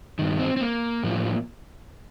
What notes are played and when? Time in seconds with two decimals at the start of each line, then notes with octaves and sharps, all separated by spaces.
0.19 G2 D#3
0.39 C4
0.57 C4
0.61 A#3
1.03 A2 F3